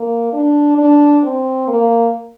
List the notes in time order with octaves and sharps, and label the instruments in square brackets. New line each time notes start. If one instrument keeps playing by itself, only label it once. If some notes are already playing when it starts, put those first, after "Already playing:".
Already playing: [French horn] A#3
D4
D4
C4
A#3